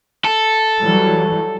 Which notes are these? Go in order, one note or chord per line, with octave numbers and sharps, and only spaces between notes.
A4
E3 F#3 G3